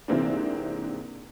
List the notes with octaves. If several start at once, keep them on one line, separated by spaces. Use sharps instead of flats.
G#2 C3 E3 A#3 C4 D4